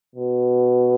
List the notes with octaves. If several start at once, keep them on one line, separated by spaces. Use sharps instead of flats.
B2